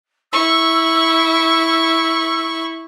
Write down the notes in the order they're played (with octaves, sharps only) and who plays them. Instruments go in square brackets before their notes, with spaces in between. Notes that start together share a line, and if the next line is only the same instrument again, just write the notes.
[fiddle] E4 C#6 [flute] E6